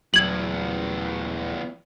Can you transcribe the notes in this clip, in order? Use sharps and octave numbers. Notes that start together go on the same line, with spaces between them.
D#1 E2 A2 F#3 G#6 F#7